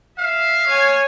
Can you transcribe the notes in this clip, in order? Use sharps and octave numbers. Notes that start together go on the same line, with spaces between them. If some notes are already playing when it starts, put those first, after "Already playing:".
E5 F5
C#5 G#5